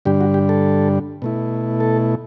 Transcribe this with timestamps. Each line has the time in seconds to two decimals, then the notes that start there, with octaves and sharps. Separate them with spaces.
0.05 G2 D3 G3 D4 G4
0.21 F#4
0.34 G4
0.49 A4
1.22 B2 A3 E4
1.80 A4